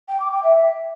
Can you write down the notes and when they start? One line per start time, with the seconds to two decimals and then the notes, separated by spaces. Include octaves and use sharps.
0.09 G5
0.20 D6
0.32 G5
0.43 E5